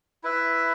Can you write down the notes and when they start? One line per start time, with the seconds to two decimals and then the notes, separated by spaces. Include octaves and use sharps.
0.24 E4 B4 E5